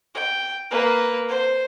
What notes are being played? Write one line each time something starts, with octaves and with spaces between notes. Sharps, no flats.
G5
A#3 B4
C5